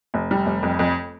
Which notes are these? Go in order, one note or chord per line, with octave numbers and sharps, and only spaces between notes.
F1
G3
F1
F2
F2